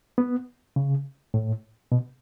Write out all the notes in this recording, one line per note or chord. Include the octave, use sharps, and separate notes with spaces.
B3
C#3
A2
B2